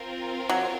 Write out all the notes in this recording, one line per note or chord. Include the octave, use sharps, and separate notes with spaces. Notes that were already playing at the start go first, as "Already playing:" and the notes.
Already playing: C4 F4 A#4
F#3